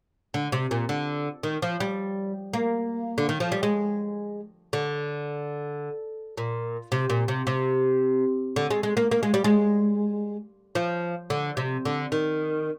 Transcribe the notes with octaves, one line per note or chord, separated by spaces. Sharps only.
D3
C3
A#2
D3
D#3
F3
G3
A#3
D3
D#3
F3
G3
G#3
D3
A#2
C3
A#2
C3
C3
D3
G#3
G#3
A#3
A#3
G#3
G3
G#3
F3
D3
C3
D3
D#3